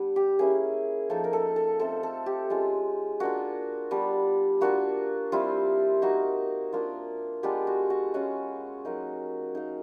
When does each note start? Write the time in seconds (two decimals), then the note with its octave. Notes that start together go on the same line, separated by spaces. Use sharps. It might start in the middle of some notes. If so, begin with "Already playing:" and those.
Already playing: G3 B3 D4
0.16 G4
0.39 A#3 C#4 E4 G#4
1.10 F3 A#3 D#4 A4
1.24 A#4
1.33 A4
1.56 A4
1.80 A3 C4 F4 A4
2.03 A4
2.26 G4
2.50 G#3 C#4 F4
3.20 A#3 D4 F4 F#4
3.91 G3 B3 D4
4.61 A#3 D4 F4 F#4
5.32 G3 C4 E4 F4
6.02 A#3 D#4 F#4
6.73 A#3 D4 F4
7.43 G#3 B3 D4 F4 G4
7.67 F#4
7.90 F#4
8.14 G#3 C#4 F4 F#4
8.85 F#3 A#3 D#4
9.55 A#3 D#4